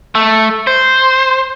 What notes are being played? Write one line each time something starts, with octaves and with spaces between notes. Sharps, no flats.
A3
C5